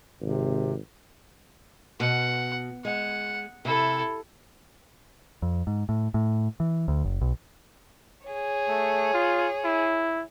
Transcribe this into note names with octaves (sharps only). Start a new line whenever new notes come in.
G#1 C3
B2 F#5
G#3 F#5
C3 E4 A4
F2
G#2
A2
A2
E3
D2
F#1
B1
G#4 C#5
A3
F4
E4